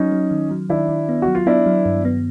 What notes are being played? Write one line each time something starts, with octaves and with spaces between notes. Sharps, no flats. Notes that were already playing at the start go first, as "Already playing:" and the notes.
Already playing: F#3 C#4 D#4
F#3
D#3
F#3
D#3 D4 E4
D#3
B3
F#4
F#3
F4
B3 D4 E4
F#3
G2
B3